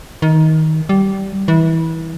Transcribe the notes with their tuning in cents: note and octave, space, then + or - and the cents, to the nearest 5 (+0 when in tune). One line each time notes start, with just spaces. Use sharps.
D#3 +20
G3 -15
E3 -25